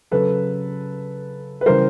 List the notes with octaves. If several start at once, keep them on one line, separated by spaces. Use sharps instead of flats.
C#3 F#3 A4 B4
B4
C#3 E3 G3 A#4 C5